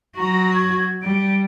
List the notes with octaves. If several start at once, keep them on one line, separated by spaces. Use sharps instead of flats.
F#3 F#4 A#5
G#6
G3 D7